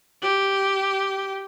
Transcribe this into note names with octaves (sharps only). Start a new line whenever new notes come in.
G4